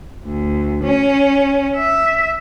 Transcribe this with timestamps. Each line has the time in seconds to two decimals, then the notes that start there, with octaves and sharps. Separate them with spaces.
0.25 D2
0.83 C#4
1.76 E5